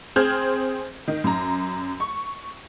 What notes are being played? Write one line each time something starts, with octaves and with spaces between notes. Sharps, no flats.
C4 G#4 C5 F6 G6 G#6
D#3
F#2 A#5
C#6